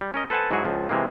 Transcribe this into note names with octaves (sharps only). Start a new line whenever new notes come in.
G3
C#4 A#4 D#5
A4 B4 C5 F#5 G#5 A5
G#2 F#3 E4 F#4 G#4
C#2 F3
C3 E3 G#3 A#3